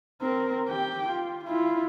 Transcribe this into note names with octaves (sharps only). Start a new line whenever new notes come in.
C4 A#4
G4 G5
F4
E4 F4